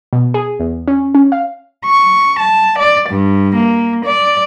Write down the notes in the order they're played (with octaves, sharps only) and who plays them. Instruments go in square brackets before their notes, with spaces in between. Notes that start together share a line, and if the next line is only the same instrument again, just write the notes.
[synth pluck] B2
G#4
E2
C#4
C#4
F5
[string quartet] C#6
A5
D5
G2
A#3
D5